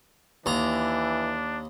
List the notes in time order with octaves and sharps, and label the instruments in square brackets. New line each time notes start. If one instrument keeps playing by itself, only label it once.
[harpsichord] D#2 A#5 [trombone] E3 [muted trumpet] D4